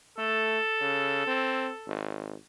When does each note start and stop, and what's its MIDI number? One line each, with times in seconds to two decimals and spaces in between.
0.18 0.58 57
0.18 2.00 69
0.81 1.26 49
1.27 1.70 60
1.87 2.34 32